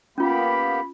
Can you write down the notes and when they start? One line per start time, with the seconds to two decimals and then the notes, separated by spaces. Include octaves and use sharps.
0.18 A#3 B3 C#4 F4 G4 B5